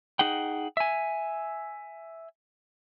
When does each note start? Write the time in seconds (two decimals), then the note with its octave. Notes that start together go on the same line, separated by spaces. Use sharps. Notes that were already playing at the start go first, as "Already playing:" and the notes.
0.19 D#4 G#4 F#5 G5
0.77 E5 G#5